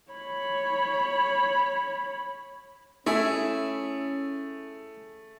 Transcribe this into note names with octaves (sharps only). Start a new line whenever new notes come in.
C#5 B5
A3 C#4 E4 G#4 E5